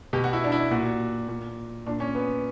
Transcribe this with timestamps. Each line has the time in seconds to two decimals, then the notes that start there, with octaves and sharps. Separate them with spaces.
0.13 B2 G4
0.24 F#4
0.33 E4
0.44 D4
0.52 E4
0.71 A#2 F#4
1.28 A#2
1.86 A#2 D4
2.00 C#4
2.15 B3